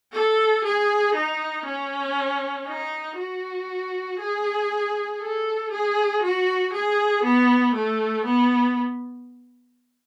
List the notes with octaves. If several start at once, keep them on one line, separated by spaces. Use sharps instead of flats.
A4
G#4
D#4
C#4
D#4
F#4
G#4
A4
G#4
F#4
G#4
B3
A3
B3